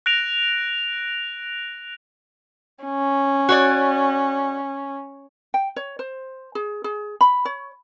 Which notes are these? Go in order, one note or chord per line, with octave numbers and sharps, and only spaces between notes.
F#6 A#6 D7 F7
C#4
F#4 C#5 D5
G5
C#5
C5
G#4
G#4
B5
C#5